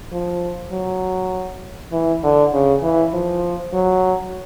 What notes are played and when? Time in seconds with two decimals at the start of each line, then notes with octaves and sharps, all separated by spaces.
0.12 F3
0.72 F#3
1.92 E3
2.23 D3
2.53 C#3
2.83 E3
3.13 F3
3.73 F#3